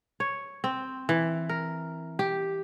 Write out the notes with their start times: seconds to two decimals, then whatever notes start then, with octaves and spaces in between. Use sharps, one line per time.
0.20 C#5
0.64 C4
1.09 E3
1.49 A#4
2.19 G4